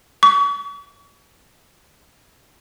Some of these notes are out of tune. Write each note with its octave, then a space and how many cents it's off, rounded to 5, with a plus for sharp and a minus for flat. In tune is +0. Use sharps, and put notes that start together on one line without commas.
C#6 +40